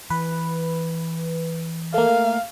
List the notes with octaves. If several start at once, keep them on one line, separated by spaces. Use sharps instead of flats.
E3 B4
A3 A#3 F5